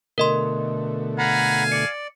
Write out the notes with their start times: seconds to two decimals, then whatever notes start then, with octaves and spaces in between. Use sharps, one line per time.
0.18 B2 D3 A3 A#4 D#5 C6
1.19 F5 F#5 G#5 A#5 B5
1.72 D5 C#7